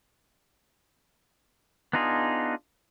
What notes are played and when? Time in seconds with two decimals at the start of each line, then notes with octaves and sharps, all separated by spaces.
1.93 B3 D4 D#4 F4 G#4